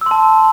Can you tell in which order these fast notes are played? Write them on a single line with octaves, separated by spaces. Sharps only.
E6 C6 A5